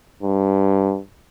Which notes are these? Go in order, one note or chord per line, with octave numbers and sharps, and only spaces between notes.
G2